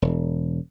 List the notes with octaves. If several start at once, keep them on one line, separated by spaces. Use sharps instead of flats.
E1